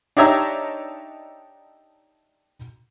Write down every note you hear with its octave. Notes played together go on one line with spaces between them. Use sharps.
D4 D#4 G4 C#5 E5 A#5